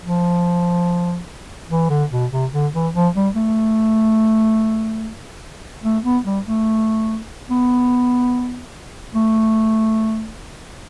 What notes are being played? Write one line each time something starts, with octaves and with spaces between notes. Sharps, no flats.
F3
E3
D3
B2
C3
D3
E3
F3
G3
A3
A3
B3
G3
A3
B3
A3